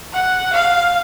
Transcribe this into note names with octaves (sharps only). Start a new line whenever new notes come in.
F#5
F5